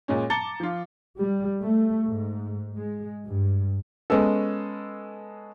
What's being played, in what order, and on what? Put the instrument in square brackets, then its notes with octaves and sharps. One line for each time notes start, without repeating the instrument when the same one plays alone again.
[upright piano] A#2 G#3 C#4
A5 A#5 D6 A6 C#7 G7
F3 F4
[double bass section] G3
A3
G#2
G#3
G2
[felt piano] G#3 B3 C#4 A4